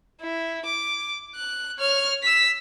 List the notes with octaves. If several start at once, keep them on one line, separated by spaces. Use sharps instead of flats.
E4
D6
F#6
C#5 F6
E6 B6